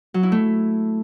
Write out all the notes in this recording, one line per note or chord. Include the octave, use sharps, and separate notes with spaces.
F#3
E4
A3